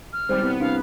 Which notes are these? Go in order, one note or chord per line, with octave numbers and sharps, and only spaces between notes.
F6
G#1 G3 C5
C2 B3
C2 D4 F5